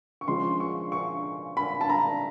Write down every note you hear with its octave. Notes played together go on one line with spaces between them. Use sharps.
C#6
C#3 F3 G#3 C6
C#6
C#6
B5
A5
A#5